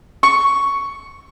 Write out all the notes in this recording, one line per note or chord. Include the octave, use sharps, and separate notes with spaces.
C#6